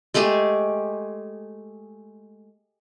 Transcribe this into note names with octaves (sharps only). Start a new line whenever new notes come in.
G#3 A3 G4 G#4